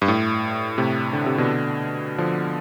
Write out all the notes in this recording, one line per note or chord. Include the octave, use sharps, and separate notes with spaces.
G2
A2
A2 C3
D3
C3
B2 D3
D3 F3